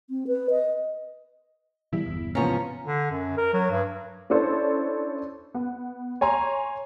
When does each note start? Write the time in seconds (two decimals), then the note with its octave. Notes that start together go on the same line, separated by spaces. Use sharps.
0.10 C4
0.28 B4
0.50 D#5
1.93 B2 E3 G3 E4
2.06 G1 E2
2.35 G#2 C3 E3 F3 B3 C#4 C#5 A#5
2.85 D3
3.11 F#2
3.37 A#4
3.53 F#3
3.70 G2
4.30 C#4 D4 E4 A4 C5
5.54 B3
6.21 C#5 G#5 A#5 C6